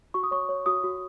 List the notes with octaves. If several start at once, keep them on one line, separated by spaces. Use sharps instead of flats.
F#4 C#6
D#6
C#5 C#6
C#5
F#4 D#6
F#4